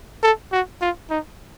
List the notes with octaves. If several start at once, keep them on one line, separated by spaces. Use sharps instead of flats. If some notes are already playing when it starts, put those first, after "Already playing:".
A4
F#4
F4
D#4